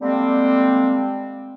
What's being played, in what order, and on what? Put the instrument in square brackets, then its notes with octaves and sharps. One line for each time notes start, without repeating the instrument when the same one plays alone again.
[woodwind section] D3 G3 G#3 A#3 C4